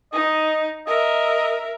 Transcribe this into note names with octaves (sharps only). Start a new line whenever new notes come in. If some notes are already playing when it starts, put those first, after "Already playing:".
D#4 D#5
A#4 D#5 E5